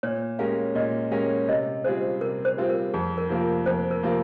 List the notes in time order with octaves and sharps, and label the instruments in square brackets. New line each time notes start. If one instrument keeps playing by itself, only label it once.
[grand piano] A#2 [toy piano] C#5
[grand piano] G#3 C#4 G4 A#4 [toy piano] F5
[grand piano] A#2 [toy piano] D#5
[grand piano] G#3 C#4 G4 A#4 [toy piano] F5
[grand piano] C3 [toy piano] D#5
[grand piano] G3 C4 F4 G#4 [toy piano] C5
[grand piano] C3 [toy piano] A#4
[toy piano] C5
[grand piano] G3 C4 F4 G#4
[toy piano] A#4
[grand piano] F2 [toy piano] G#4
[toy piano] A#4
[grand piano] C3 F3 A#3 F4
[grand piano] F2 [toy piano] C5
[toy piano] A#4
[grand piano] C3 F3 A#3 F4